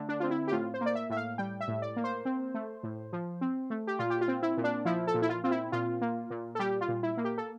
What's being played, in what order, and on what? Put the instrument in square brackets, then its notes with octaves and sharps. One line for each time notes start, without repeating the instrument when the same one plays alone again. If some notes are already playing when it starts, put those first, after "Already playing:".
Already playing: [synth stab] D3 A3
D4
C4 F4
E4
G4
A2 F4
C5
A#3 D5
E5
A2 E5
F5
G3 G5
E5
A2
D5
A#3
C5
C4
A3
A2
F3
C4
A3
G4
A#2 F4
G4
F4
C4
E4
A#2
D4
F3 E4
A4
A#2
E4
F4
C4 F4
E4
A#2 F4
A#3
A#2
A4
G3 G4
F4
A#2
E4
A#3
G4
A4